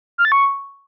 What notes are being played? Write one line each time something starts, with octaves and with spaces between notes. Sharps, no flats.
F6
A6
C#6